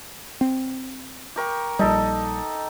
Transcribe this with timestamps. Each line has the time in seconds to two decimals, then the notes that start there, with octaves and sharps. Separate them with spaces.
0.41 C4
1.36 G4 A#4 C#6
1.79 A#1 G3 D#4 A4